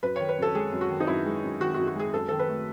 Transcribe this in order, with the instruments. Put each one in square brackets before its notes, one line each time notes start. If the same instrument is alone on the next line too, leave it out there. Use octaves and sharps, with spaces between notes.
[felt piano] F#2 B4
D#3 C#5
B4
F#2 A4
G#3 G#4
F#2
F#4
D#3
D#4
F#2 E4
G#3
F#2
D#3 F#4
F#2 F#4
F#4
G#3 G#4
F#2 A4
D#3 A4
B4
A3